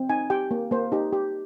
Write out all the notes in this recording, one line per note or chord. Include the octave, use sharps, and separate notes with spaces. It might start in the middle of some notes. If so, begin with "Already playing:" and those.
Already playing: C4
D#4 G#5
G4 G5
A#3
A#3 C5
D#4 G4
G4